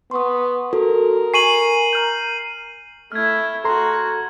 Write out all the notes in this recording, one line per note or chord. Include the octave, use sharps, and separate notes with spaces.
B3 C6 C#6 D#6
F#4 A4 A#4
G#5 C#6 C7 D#7 F#7
A#5 F6 G6
A3 E4 F6 G#6
F#4 A4 A#5 C6